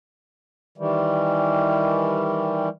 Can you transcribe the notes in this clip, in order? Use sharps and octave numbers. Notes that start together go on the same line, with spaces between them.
D#3 E3 G3